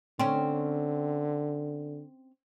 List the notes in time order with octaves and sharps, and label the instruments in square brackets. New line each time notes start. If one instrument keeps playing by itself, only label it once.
[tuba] D3 [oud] C4 C#4